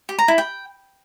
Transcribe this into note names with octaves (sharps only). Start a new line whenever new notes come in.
G4
A#5
E4
G5